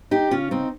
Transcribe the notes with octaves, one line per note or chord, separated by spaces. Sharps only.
D#4 G4
C#3 C#4 F4
C4 D#4